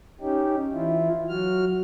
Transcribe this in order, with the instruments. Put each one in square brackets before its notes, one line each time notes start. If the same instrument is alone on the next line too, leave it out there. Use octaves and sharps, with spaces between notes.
[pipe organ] C#4 D#4 G4
E3 E4 F4
F#3 F#4 F6